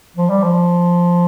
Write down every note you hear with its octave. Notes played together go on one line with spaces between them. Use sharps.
F3
G3
F3